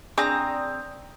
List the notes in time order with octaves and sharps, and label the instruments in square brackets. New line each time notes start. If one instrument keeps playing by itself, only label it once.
[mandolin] C4 A#5 [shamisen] D4 G#4 [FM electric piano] D5 D#6